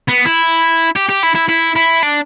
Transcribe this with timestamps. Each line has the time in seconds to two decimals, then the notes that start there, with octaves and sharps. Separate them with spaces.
0.09 B3
0.25 E4
0.96 G4
1.09 G4
1.23 E4
1.35 E4
1.49 E4
1.76 E4
2.03 D4